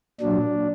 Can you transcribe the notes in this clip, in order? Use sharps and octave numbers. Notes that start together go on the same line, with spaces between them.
A#2 F#3 D4